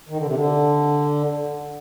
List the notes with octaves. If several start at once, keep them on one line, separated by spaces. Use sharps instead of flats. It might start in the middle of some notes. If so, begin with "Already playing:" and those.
D#3
D3
C3
D3